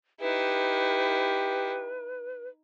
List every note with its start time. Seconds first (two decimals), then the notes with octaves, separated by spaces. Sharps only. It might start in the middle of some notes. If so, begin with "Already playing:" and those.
0.21 D#4 E4 G4 B4